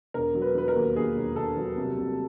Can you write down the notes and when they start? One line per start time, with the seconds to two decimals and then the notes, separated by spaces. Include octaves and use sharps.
0.14 E1 A#4
0.35 F#3
0.42 B4
0.55 F#3 B4
0.68 A#4
0.75 D#2
0.96 D#2 G#4
1.17 E1
1.36 E1 A4
1.57 F#3
1.77 C2
1.98 C2